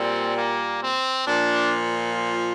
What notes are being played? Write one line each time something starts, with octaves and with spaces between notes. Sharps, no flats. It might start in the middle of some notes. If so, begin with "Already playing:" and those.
Already playing: A#2 G3 C4
A#3
C4
A#2 F3 D4